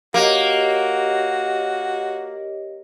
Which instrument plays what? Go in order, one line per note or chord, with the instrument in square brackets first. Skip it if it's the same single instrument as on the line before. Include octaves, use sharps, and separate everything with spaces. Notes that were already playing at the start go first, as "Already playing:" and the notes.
[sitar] A#3 [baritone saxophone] F#4 [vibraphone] G4 C#5 D#5